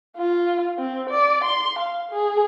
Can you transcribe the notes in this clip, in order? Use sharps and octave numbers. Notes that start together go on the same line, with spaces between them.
F4
C4
D5
C6
F5
G#4